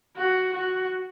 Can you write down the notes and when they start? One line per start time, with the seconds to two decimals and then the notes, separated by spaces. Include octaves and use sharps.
0.16 F#4
0.54 F#4